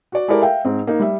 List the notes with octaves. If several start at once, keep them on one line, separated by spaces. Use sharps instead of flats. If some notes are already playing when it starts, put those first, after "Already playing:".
F#4 D5
G#3 E4 G4 A4 A#4 D5
E5 F5 G5
G#2 C4
A#3 D#4
G3 E5